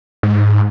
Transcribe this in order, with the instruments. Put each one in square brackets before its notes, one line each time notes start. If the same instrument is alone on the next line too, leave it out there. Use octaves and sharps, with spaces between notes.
[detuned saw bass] G#2